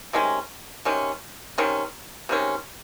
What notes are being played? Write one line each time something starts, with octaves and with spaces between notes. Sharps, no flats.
C3 D#3 G#3 C#4
C3 D#3 G#3 C#4
C3 D#3 G#3 C#4
C3 D#3 G#3 C#4